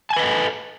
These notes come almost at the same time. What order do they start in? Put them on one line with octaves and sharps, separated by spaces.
A5 G#5 B4 D#5 A4